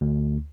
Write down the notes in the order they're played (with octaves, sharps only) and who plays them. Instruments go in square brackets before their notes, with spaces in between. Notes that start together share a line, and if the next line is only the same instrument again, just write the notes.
[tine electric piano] D2